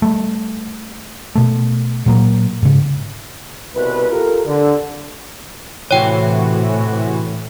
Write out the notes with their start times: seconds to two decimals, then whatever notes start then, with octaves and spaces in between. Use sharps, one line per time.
0.02 G3 A3
1.35 B2 A3
2.06 A#2 F#3 A#3
2.62 G#2 C#3
3.75 C2 B2 G3 B4
4.09 F4 G4 A4 A#4
4.45 D3
5.91 A2 C3 E3 F#4 C#5 G5